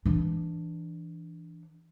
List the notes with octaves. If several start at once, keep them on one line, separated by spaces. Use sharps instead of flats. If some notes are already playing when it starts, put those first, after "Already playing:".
E3 D4